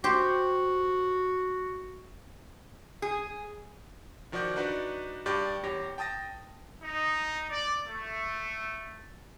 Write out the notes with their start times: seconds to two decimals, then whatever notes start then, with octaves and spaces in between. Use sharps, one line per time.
0.04 F#4 G4 C5
3.02 G#4
4.32 D#3 F3 F#4 D5 D6 G6
4.56 D4 D#4 F#4 B4 D5
5.26 G2 G4 D5 D6 G6 A6
5.64 E2 G4 C#5 A#6
5.98 G5 A5 D#6 A6 A#6
6.84 D#4
7.51 D5
7.86 A3